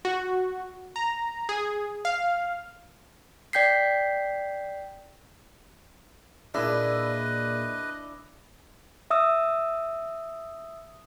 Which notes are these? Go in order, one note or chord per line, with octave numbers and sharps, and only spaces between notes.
F#4
A#5
G#4
F5
D5 G5 G6 B6 C7
A#2 D4 E4 G#4 B4 D#5 E5
E5 D#6 E6